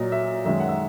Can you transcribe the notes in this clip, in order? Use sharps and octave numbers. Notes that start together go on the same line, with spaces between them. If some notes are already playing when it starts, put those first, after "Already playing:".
Already playing: A#2 F#3 D#5
E5
F#2 D#3 G#3 E5
F#5
E5